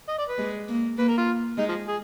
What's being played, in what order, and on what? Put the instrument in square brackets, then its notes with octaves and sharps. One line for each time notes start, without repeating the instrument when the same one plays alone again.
[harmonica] D#5
D5
B4
[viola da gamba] G#3
A#3
[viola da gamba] A#3 [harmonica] B4
[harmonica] A#4
F4
[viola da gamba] G#3 [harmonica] D#4
[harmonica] F3
G#4